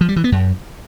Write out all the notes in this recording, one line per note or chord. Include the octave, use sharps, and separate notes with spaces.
F3
G3
E3
B3
F#2